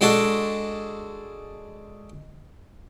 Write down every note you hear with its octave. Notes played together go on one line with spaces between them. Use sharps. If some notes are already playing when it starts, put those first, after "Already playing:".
G#3 D4 F#4 A4